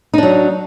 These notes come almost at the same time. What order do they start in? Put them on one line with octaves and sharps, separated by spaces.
D#4 D4 F#3